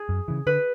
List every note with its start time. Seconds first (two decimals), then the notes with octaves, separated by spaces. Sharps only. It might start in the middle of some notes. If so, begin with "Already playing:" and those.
Already playing: G#4
0.09 F#2
0.28 C#3 E3
0.46 D3 B4